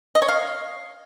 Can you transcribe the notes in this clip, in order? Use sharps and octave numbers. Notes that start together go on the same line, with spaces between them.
D#5
C#5
F5